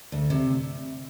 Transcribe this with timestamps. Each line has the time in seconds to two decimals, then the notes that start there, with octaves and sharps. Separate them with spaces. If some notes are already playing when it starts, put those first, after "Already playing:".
0.12 D2
0.30 C3